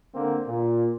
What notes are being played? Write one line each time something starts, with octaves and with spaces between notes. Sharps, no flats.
D3 A#3 C4
A#2